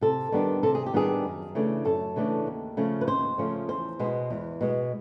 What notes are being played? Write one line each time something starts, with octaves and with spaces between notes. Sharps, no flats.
C3 A4
D#3 G3 B3 D4
C3 A4
G#4
G4
D#3 G3 B3 D4 G#4
F#2
C#3 E3 A3 D4
F#2 A4
C#3 E3 A3 D4
D#2
C#3 F3 A3 C#4
B4
D#2 C5
C#3 F3 A3 C#4
E2 C5
B2 G#3 B3
E2
B2 G#3 B3